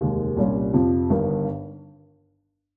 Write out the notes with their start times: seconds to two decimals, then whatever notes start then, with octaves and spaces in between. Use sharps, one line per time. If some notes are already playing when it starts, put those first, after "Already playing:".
0.01 F1 D#2 D#3 G#3
0.37 C2 A#2 G3 C#4 F4
0.73 F2 C3 F3
1.10 G1 G2 D#3